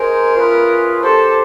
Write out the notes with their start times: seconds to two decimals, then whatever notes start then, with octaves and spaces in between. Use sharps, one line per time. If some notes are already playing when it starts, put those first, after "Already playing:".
Already playing: D#4 G#4 A#4 C5
0.35 C#4 F4 G#4 B4 E5
1.03 D4 G4 A4 C5